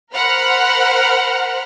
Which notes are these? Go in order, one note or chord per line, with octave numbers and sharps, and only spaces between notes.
A#4 C5 F#5 B5 F6